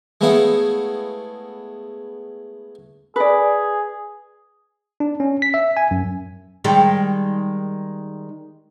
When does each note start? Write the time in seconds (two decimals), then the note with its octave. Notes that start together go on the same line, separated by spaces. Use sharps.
0.21 G#3 A3 B3 E4 C#5 F5
3.16 G#4 B4 D5
5.00 D4
5.20 C#4
5.42 B6
5.54 E5
5.77 G#5
5.91 F#2
6.64 D#3 G3 G#3